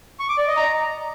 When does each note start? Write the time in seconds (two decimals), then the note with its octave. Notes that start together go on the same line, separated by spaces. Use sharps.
0.20 C#6
0.29 D6
0.38 D5
0.47 D#5
0.57 A#5